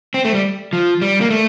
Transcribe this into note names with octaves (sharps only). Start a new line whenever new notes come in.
C4
A3
G3
F3
G3
A#3
A3